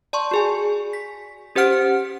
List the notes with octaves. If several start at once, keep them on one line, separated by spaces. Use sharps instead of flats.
D5 A5 C6 C#6
F#4 G#4 G#5
B6
C#4 G4 C5 F#5 F6 D7